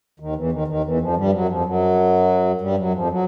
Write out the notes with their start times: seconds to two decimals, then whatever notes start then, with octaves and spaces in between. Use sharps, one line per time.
0.20 D#2 D#3
0.36 E2 E3
0.52 D#2 D#3
0.68 D#2 D#3
0.84 E2 E3
1.00 F2 F3
1.16 G2 G3
1.32 F#2 F#3
1.48 F2 F3
1.65 F#2 F#3
2.61 G2 G3
2.78 F#2 F#3
2.93 F2 F3
3.10 F#3